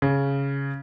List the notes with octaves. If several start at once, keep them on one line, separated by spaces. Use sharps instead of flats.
C#3